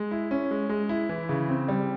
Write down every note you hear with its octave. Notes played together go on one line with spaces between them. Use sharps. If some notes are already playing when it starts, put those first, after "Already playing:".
Already playing: G#3
E4
C#4
G#3
G#3
E4
E3
C#3
C4
G3